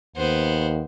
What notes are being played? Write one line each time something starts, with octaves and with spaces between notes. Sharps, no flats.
D#2 B3 C5